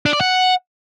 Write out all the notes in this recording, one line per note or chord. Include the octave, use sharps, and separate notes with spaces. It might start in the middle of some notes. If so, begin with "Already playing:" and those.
D4
D5
F#5